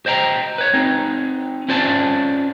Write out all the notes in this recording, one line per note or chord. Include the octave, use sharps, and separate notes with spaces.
C5 D#5 G5 A#5
B4 C#5
C4 D#4
C#4 F4 C5 D5 G#5 A5